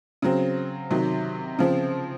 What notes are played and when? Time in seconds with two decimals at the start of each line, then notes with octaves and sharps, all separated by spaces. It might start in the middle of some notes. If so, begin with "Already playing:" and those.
0.22 C#3 F#3 C4
0.91 C3 D#3 F#3
1.59 C#3 F3 C4